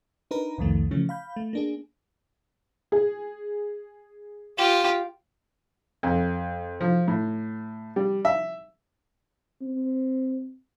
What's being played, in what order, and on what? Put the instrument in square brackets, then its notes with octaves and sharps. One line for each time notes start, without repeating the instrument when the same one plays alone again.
[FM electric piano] D4 D#4 A#4 B4 A#5
C2 F2 D#3 A3
C#3 E3 F3 A3 C#4
F5 B5 G6
A3
A#3 D4 G#4
[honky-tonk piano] G#4
[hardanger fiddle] F4 G4
[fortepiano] F2
F3
A2
G3
E5
[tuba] C4